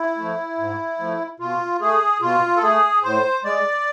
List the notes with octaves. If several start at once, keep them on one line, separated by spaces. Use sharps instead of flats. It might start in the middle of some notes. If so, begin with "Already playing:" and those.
Already playing: E4
F3 A3
G#2
F3 A3
B2 F4
A3 G#4
B2 F4
A4
A3 G#4
A2 C5
G#3 D5